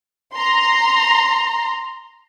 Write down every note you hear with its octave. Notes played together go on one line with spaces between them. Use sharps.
A#5 C6